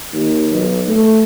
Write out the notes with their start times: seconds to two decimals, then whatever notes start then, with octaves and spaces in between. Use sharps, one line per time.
0.13 D#2
0.51 B1
0.88 A3